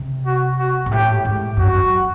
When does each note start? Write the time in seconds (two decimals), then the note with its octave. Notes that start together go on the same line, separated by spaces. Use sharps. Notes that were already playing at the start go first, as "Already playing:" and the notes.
Already playing: C3
0.26 F#4
0.59 F#4
0.86 G#2
0.91 A2 G4
1.25 G#2
1.57 F#2 F#4
1.74 F#2